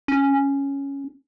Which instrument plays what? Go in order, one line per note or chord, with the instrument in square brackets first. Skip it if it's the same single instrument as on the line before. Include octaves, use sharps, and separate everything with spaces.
[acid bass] C#4